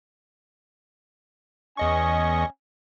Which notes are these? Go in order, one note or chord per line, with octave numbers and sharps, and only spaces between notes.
E2 C#4 D#5 G#5 C#6